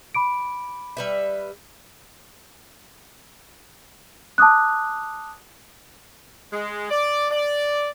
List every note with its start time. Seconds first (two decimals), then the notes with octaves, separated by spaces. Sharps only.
0.15 B5 D6 D7
0.97 G3 B4 E5
4.38 A5 D6 D#6 F#6
6.52 G#3
6.90 D5
7.31 D5